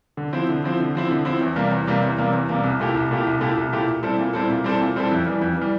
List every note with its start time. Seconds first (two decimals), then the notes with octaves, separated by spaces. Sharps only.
0.17 D3
0.33 F3 C4 E4
0.49 D3
0.64 F3 C4 E4
0.80 D3
0.95 F3 C4 E4
1.11 D3
1.25 F3 C4 E4
1.41 E2
1.56 C3 G3 A#3
1.71 E2
1.87 C3 G3 A#3
2.03 E2
2.18 C3 G3 A#3
2.33 E2
2.49 C3 G3 A#3
2.64 C2
2.80 A#2 A3 E4 G4
2.94 C2
3.11 A#2 A3 E4 G4
3.26 C2
3.41 A#2 A3 E4 G4
3.56 C2
3.73 A#2 A3 E4 G4
3.87 A#2
4.03 G3 C4 E4 A4
4.18 A#2
4.33 G3 C4 E4 A4
4.50 A#2
4.64 G3 C4 E4 A4
4.80 A#2
4.96 G3 C4 E4 A4
5.11 F2
5.27 E3 G3
5.41 F2
5.57 E3 G3